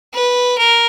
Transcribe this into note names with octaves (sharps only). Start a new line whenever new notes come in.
B4
A#4